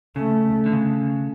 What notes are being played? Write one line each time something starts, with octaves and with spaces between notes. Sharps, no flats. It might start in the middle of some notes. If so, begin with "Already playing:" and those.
C#3 A3
D3
C#3